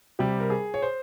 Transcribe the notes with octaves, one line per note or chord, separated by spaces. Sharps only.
C3 G3 G4
A#4
G#4
C#5
C5